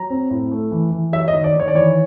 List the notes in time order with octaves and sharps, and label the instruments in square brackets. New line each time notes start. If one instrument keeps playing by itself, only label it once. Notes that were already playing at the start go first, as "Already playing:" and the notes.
Already playing: [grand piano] F#3 A#5
C4
A2
A3
E3
E3
F#3 E5
D#5
D#3
D5
D#3
C#5
D5
E3 C#5